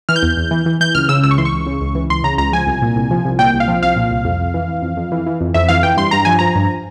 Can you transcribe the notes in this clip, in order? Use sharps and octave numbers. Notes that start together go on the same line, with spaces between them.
E3 F6
G6
E2
E2
E3
E3
E3 G6
C#2 F6
C#3 E6
C#2 E6
C#6
E3 C6
C#6
C#2
C#3
C#2
E3
C#2 C6
C#3 A#5
C#2 A#5
F3 G#5
C2
A#2
C2
F3
C2
A#2 G5
C2
F5
F3
C2 F5
A#2
C2
F2
F2
E3
E3
F2
F2
E3
E3
F2
F2 E5
E3 F5
E3 G5
G2 C6
G2 A#5
F3 G#5
F3 A#5
G2